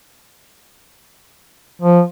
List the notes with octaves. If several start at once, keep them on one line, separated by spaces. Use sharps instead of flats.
F3